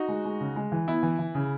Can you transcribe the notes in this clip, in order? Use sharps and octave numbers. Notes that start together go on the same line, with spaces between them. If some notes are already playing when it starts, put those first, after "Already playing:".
Already playing: D#4 F#4
G#3
G#3
C#3
G#3
E3
B3 E4
E3
E3
C#3